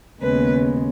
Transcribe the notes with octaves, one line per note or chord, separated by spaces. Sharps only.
D#2 C#3 G#3 B3 B4